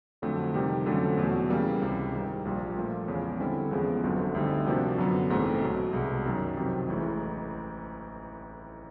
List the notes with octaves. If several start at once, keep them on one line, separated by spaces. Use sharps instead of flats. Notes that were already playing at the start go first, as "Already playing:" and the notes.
F2 D3 F#3 A3
F2 C3 D#3 G3
F2 D3 F#3 A3 C#4
E2 B2 F#3 A3
C#3 E3 G3 A#3
C#2 C3 E3
G#2 D#3 G3
A#1 A#2 G3
A#2 F3 A3
E2 C#3 F3 G#3 C#4
D3 G3 C4 E4 A4
E2 C#3 F3 G#3 B3
G1 F2 D3 F#3
D2 D3 G3 C4 D#4
C3 F3 A#3 D4 F#4
F#2 D3 F#3 B3
A#1 G#2 E3 A3 C4
B1 B2 F#3
C2 B2 G#3
F#2 D#3 F#3
F2 C3 D#3 F#3
A1 A2 E3 G#3